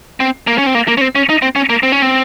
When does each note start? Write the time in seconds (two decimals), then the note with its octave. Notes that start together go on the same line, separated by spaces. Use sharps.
0.20 C4
0.47 A#3
0.58 C#4
0.66 C4
0.75 A#3
0.88 A#3
0.97 C#4
1.01 C4
1.15 C#4
1.29 D#4
1.42 C4
1.56 C#4
1.69 A#3
1.83 C4
1.92 C#4
2.02 C4